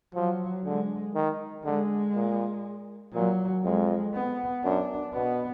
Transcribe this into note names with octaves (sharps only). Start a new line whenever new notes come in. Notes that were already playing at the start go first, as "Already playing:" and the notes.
F3 F#3
D3 G#3
D#3
D3 G#3
A#2
A#2 F#3
F2 G#3
B3
F#2 D4
B2 B3